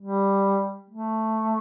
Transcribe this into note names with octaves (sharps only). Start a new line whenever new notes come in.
G3
A3